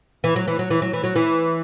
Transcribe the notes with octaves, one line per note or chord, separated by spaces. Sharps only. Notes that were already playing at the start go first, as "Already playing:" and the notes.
E3
F#3
E3
F#3
E3
F#3
E3
F#3
E3